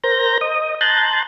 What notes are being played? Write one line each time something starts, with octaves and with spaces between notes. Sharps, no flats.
A#4 C5 A#5 G6 A#6
D#5 D#6
A5 A#5 C6 F#6 G6 A6